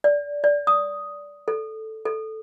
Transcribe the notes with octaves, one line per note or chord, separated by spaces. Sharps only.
D5
D5
D#6
A4
A4